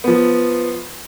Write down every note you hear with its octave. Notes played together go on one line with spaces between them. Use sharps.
F3 B3